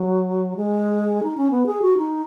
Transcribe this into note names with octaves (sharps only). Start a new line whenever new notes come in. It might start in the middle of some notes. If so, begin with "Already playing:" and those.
Already playing: F#3
G#3
D#4
C#4
B3
G#4
F#4
D#4